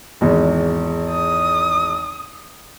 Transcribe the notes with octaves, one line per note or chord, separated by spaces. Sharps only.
G#1 E2 G#3
D#6